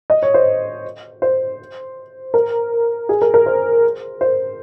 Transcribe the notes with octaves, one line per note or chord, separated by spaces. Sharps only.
D#5
C#5
C5
C5
A#4
G#4
A#4
A#4
C5
C5